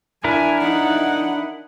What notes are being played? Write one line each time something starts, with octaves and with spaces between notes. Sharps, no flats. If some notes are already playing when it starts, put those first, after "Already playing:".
D4 E4 A#4 G#5
D#4 F#5